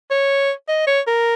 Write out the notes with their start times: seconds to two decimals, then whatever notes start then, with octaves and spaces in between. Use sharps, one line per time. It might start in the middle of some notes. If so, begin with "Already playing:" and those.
0.10 C#5
0.68 D#5
0.87 C#5
1.07 A#4